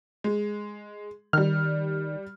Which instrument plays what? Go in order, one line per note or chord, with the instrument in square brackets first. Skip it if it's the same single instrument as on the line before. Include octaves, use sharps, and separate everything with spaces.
[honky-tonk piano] G#3
[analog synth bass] D#3 [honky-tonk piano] G3 F6